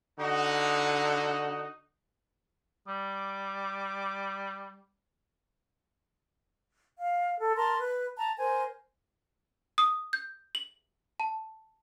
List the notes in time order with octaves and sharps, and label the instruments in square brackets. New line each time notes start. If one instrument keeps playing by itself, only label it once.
[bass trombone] D3 [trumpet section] D#4 F#4
[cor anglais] G3 [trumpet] D6
[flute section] F5
A4
A#4 A5 C6
B4
A5 A#5
A#4 C5 G#5
[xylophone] D#6
G6
F#7
A5